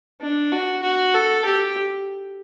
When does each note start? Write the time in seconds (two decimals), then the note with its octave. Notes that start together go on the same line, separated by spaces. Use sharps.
0.21 D4
0.52 F#4
0.83 F#4
1.14 A4
1.45 G4